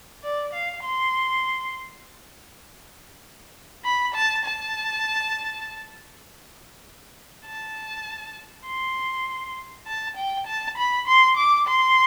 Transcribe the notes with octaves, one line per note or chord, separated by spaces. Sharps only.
D5
F5
C6
B5
A5
A5
A5
C6
A5
G5
A5
B5
C6
D6
C6